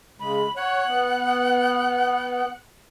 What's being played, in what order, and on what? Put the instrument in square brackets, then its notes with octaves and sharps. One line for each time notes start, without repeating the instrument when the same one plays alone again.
[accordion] C#3 G#3 [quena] B5
[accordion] C#5 [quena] F#5
[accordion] B3